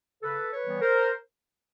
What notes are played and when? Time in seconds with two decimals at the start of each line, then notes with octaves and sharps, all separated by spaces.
0.23 C#3 A4 B4
0.51 B4 C#5
0.66 E3 G3 B3
0.81 A#4 C5